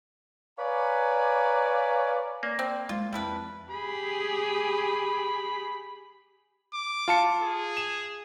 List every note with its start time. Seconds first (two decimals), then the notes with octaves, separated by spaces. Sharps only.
0.58 B4 C#5 D5 F5 G#5 A#5
2.43 A#3 D5
2.59 C4
2.89 G#3 F4 F5
3.13 F2 F3 G3 E4 B4 A5
3.71 G4 G#4 B5
6.74 D6
7.08 F4 A5 C#7
7.41 G#4
7.77 E7